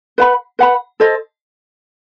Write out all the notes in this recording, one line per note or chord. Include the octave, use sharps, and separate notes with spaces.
B4 F#5 B5
B4 F#5 B5
A4 C5 D#5